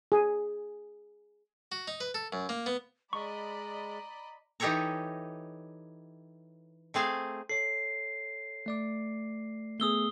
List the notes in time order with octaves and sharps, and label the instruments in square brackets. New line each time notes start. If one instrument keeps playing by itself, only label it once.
[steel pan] G#4
[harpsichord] F#4
D#4
B4
A4
F#2
A#3
B3
[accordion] G#3 [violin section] D5 D#5 B5 [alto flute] A#5 [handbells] C#6
[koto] E3 D#4 G4 A4 C#5 A#5
A3 C4 G#4 F5
[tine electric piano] A4 C#5 [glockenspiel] C7
[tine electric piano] A3 D5 D6
[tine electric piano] A3 B3 G#4 [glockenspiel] D#6 E6 G7